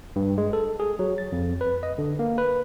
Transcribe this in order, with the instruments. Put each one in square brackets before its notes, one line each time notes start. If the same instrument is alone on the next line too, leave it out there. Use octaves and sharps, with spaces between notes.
[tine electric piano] G2
G#3
A4
G#4
F#3
A6
F2
B4
D#5
D3
A#3
B4